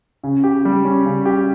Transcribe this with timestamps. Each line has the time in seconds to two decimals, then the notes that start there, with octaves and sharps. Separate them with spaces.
0.24 C#3
0.44 G4
0.65 G3
0.85 C#4
1.06 C#3
1.26 G4